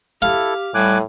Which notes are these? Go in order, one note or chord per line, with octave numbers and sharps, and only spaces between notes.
E4 G4 A4 F5
A2 G3 G#5 D6 F#6